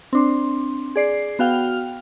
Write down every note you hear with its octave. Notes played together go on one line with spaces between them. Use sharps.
C4 D4 C6
G#4 D5 C7
B3 F#4 F5 G5 F6 F7